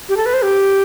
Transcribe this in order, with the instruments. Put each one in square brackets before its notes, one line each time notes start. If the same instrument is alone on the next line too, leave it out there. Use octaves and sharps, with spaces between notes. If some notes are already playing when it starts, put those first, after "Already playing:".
[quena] G4
A4
B4
C5
G4